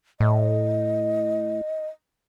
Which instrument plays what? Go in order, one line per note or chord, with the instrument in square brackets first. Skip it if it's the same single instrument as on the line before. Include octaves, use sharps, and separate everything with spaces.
[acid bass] A2 [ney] D#5